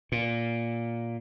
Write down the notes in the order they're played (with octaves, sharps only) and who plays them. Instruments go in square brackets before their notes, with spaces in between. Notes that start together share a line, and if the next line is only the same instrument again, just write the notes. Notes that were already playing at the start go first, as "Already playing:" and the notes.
[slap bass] A#2